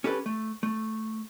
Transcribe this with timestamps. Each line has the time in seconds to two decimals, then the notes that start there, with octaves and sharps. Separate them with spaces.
0.04 C#4 G4 A4 B4
0.26 A3
0.63 A3